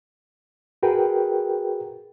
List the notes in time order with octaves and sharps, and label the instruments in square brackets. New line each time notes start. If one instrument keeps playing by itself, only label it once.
[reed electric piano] F#4 G#4 A#4 B4 G5